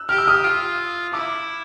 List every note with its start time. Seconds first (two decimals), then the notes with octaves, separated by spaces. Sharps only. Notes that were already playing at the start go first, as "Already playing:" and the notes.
Already playing: E6 F#6
0.09 G4 F6
0.18 E6
0.28 D#6 F6
0.44 F4
1.13 E4 D6 E6